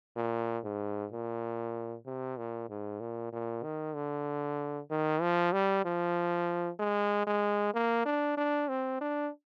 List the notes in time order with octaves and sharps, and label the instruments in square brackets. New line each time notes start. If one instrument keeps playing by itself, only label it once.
[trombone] A#2
G#2
A#2
C3
A#2
G#2
A#2
A#2
D#3
D3
D#3
F3
G3
F3
G#3
G#3
A#3
D4
D4
C4
D4